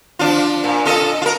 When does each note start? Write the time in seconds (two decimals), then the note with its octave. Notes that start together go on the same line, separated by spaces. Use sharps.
0.19 F3 D4 F4
0.64 A#2
0.85 F4 A4 D#5
1.22 F4 A#4